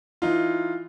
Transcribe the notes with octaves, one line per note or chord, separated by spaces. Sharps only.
E3 D#4 F4